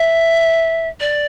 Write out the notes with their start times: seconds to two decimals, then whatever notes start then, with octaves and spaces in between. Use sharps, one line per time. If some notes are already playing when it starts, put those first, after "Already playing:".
Already playing: E5
1.00 D5